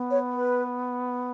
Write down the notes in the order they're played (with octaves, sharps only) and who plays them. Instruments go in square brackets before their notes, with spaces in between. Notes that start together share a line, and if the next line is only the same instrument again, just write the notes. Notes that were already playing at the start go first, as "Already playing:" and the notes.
Already playing: [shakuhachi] B3
[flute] C#5
B4